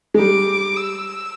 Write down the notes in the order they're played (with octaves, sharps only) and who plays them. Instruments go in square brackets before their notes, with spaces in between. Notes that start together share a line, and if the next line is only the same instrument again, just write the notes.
[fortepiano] G#3
[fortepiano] G3 [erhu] D6
[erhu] E6